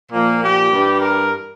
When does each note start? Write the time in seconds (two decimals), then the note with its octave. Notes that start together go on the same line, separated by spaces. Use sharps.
0.11 A#2 F3 A#3
0.41 G4
0.70 G2 E3 G3
0.99 A#4